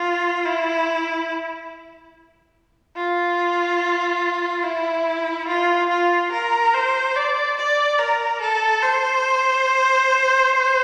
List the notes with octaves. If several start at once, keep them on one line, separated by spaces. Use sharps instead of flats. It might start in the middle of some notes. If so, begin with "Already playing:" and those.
Already playing: F4
E4
F4
E4
F4
F4
A#4
C5
D5
D5
A#4
A4
C5